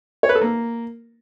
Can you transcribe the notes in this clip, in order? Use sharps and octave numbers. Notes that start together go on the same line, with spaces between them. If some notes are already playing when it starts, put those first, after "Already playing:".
C#5
B4
A4
A#3